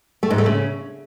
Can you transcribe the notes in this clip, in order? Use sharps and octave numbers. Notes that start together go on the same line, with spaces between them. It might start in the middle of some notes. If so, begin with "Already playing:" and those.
A3
G#2
A3
C#3